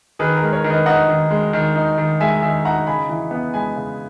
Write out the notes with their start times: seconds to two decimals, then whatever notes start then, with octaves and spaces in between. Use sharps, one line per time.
0.19 D#3 G#4 B4
0.37 A#4
0.43 G#3
0.53 A#4 C#5
0.64 D#3
0.70 B4 D#5
0.86 D#4 D#5 F#5
1.08 D#3
1.31 G#3
1.53 D#3
1.76 D#4
1.98 D#3
2.20 G#3 E5 G#5
2.42 D#3 E5 G#5
2.65 D#4 F#5 A#5
2.87 C#3 G#5 B5
3.09 E3
3.31 B3
3.54 G#3 G#5 B5
3.76 C#3